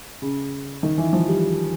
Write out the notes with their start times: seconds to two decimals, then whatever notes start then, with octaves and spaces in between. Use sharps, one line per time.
0.22 C#3
0.83 D#3
0.98 E3
1.13 F3
1.27 G3